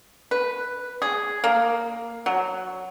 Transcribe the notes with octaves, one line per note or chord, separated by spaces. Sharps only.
B4
G#4
A#3
F#3